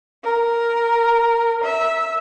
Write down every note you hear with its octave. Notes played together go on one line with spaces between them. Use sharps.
A#4
E5